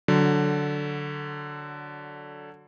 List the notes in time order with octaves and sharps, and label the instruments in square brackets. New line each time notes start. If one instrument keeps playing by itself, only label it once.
[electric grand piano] D3 F#3